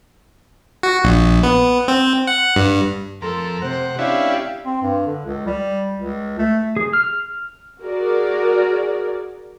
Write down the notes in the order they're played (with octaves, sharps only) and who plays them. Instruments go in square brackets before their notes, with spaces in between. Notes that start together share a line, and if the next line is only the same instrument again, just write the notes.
[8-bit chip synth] F#4
A#1
B3
C4
F#5
G2
[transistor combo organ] F2 A#4 [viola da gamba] A4 [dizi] C6
[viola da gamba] C3 [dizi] C5 [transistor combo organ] F#5
[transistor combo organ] C#4 D4 E4 [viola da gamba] G4 [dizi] F5
[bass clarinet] C4
G2
D3
C#2
G3
C#2
A3
[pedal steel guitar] G#4
F6
[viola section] F#4 G#4 A#4 D5